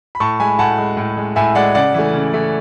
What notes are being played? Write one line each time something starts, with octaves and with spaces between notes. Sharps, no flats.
B5
A2 A5 C#6
G#3 G#5 B5
A2 F#5 A5
G#3
A2
G#3
A2 E5 G#5
G#3 D5 F#5
C#3 D5 F#5
E3 A3
C#3
E3 A3